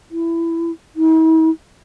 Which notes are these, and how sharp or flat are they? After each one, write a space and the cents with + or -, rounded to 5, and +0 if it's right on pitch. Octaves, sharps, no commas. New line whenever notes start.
E4 +15
E4 -45